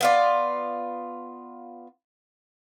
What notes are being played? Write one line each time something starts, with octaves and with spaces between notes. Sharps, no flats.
B3 F4 D5